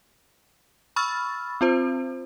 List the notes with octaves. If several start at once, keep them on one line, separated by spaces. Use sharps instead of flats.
B5 C#6 E6 F6 A6
C4 F4 C5